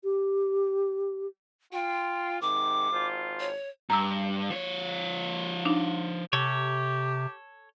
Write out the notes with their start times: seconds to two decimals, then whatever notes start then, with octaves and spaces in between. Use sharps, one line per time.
0.04 G4
1.73 F4 G5
2.41 G#2 C3 D#3 D6
2.91 G#1 F4 C5
3.40 C#5
3.90 G2 A#5 E6
4.50 F3 C#5
5.65 D4 D#4
6.33 C3 G4 A4 C#5